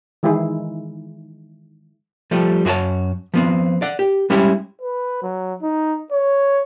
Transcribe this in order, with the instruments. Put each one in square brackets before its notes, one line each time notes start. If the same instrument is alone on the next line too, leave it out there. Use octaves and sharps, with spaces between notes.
[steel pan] D#3 E3 G#3 D#4 E4 G#4
[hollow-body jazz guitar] F3 G3 A3
F#2 F#4 G#4 C#5 A5
F3 B3 C4
D5 F#5
G4
G3 G#3 C#4 E4 G4
[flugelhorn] B4
F#3
D#4
C#5